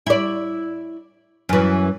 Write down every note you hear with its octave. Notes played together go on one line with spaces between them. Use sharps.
E4 D5
F#2 E3